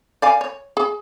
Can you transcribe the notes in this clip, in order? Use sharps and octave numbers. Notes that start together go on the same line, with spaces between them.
D5 F5 G#5
C#5
G#4